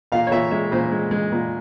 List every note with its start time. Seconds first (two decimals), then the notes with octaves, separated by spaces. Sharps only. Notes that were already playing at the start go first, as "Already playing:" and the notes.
0.12 A#2 F5
0.27 C#5
0.31 A#2 E5
0.51 G#3 E5
0.71 A#2 C5
0.92 G#3
1.11 G#3
1.32 A#2